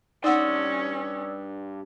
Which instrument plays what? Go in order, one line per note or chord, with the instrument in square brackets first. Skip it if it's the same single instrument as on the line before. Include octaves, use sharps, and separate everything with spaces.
[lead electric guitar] G2 C6 [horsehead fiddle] C#4 [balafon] D#4 F#5 [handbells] D5 D#6 E6